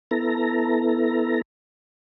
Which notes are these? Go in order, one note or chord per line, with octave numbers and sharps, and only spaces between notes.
B3 E4 A4 A#5